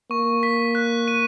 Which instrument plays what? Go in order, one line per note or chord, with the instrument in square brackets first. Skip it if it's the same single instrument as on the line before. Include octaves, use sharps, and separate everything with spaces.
[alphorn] A#3 [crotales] C#6
[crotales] B6
F#6
D#7